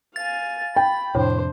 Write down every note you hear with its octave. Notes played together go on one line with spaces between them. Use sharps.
F5 G#5 A6
G5 B5
F2 A2 C3 D4 C5